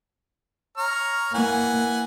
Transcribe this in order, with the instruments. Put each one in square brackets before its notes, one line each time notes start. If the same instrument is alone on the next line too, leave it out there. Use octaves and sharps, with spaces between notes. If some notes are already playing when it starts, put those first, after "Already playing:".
[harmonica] C#5 A#5 F6
[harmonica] E3 F#5 G#5 [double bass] A#3